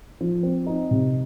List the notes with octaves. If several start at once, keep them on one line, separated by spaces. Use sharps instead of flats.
F3
C4
D#4
C3